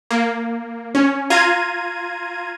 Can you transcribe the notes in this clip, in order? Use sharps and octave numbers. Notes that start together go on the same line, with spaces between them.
A#3
C#4
F4 A#5 G#6 D#7